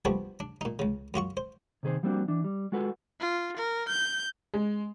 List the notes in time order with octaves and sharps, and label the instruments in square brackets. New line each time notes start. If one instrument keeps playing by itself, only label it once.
[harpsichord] F3 G3 A3 B3 D4 F#4
D4
A#2 D#4
C#2 C#3
F#2 F4 F#4 C#6
C5
[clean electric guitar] C3 D#3 G#4 B4 C5
F3 G3 A#3 C4 D4 F#4
E3 D4
G3
G#3 F4 F#4 A4 B4
[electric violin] F4
A#4
G6
[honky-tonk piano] G#3